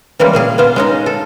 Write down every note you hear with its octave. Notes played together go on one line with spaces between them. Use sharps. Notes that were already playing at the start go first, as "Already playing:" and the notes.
E3 G3 G#3 A#3 C#4
A#2 A#3 G#4
B3 F4 C5
G#3 C#4 D#4
A4